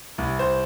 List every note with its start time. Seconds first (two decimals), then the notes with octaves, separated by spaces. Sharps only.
0.18 C2
0.39 C5